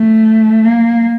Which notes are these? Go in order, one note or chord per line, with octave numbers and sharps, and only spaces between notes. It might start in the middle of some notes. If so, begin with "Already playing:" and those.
Already playing: A3
A#3